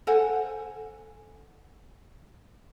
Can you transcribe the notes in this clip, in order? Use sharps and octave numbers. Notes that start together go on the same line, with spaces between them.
A4 C5 F#5 G#5